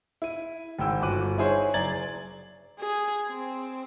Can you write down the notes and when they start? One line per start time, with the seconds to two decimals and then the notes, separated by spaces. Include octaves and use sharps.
0.22 E4 D#7
0.79 G#1 G#2 G5 E6
1.01 G1 F#4 D6 F#6 D#7
1.38 D#4 E4 G#4 C5 C#5
1.74 F#1 D5 A#5 G#6 A6 F#7
2.79 G#4
3.29 C4